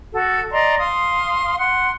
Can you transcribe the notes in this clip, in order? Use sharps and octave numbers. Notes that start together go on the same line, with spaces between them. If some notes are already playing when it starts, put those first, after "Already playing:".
F#4 A4
D5 D#5 A#5 C6
F5 C6 D#6
F#5 C6